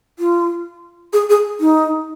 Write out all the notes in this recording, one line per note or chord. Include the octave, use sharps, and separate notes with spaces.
F4
G#4
G#4
D#4